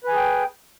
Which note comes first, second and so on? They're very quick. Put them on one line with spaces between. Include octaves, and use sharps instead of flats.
B4 G#5 G#4 G5